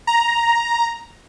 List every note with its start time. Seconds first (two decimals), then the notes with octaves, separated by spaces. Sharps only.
0.07 A#5